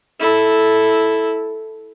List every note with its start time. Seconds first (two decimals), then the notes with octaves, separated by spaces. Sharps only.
0.20 E4 A4